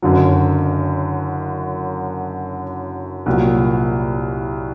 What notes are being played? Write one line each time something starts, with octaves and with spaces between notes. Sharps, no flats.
F#1 F#2 D3 F#3
C2 A#2 F#3